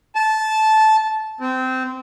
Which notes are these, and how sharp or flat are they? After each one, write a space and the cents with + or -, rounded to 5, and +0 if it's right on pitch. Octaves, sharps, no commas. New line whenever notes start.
A5 -15
C4 -20